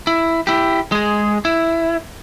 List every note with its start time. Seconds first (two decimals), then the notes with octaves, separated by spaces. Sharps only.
0.07 E4
0.47 E4 G4
0.92 G#3 G#4
1.45 E4